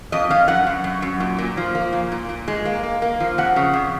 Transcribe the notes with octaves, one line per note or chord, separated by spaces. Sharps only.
F2 D#5
F2 F5
F#2 F#5
F#2
F#2
F#2
A#2
A#2
F3
A#3
A#2
A#2
A#2
G#3
A#3
A#3
A#3
F3
F2 F#5
C#3
F2